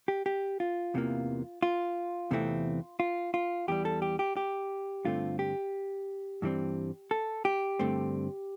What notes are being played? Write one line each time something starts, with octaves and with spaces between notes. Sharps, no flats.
G4
G4
F4
E2 C3 E3 A#3
F4
E2 C3 E3 A3 C4
F4
F4
E2 E3 G3 G4
A4
G4
G4
G4
G2 D3 A3 C4 F4
G4
G2 E3 G3 C4
A4
G4
G2 D3 A3 C4